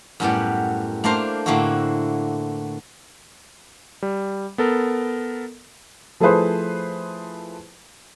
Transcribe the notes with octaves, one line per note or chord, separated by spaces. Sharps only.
F#2 A2 F#3 G3 B3 D5
A3 A#3 D4 A#4 C5 F5
A2 D3 A#3 C4 E4 F#4
G3
B3 A4 A#4
F3 A3 E4 G#4 B4 C5